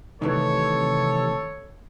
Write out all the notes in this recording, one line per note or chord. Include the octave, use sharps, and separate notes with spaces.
C3 D#3 E3 A3 A4 C#5